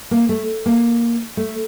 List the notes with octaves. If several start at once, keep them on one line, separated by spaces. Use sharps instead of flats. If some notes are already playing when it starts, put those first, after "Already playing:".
A#3
A3
A#3
A3